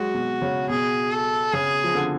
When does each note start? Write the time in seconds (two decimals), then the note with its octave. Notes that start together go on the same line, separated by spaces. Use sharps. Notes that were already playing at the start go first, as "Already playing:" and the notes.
Already playing: F#3 G#3 F#4
0.14 B2
0.42 C#3
0.69 B2 G#4
1.12 A4
1.53 C#3 G#4
1.84 F3
1.95 D3